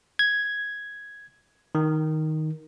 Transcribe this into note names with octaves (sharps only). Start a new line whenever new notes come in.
G#6
D#3